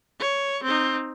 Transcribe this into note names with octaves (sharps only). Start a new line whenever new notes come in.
C#5
C4 D#4